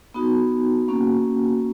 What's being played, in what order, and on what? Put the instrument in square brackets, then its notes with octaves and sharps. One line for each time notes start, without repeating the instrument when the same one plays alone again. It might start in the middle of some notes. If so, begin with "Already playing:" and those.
[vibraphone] B3 D#4 F#4
A#3 C#4 F#4